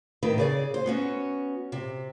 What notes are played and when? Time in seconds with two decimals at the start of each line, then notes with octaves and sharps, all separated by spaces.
0.23 A2 D#3 D#4 B4
0.38 C#3 G#4 D5
0.74 C5
0.86 B3 C#4 F#4
1.72 C3